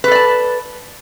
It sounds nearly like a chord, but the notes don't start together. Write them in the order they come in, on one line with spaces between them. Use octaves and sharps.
B4 A4 D5 A5